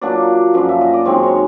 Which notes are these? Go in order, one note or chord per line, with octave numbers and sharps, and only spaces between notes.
A#2 F#3 A#3 D4 D5
F#2 D3 F3
E5
D#5
D5
F#2 D#3 G#3 C4 C#5
C#5